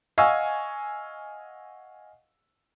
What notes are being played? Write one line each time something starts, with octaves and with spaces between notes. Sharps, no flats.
D#5 F5 F#5 G#5 C#6 E6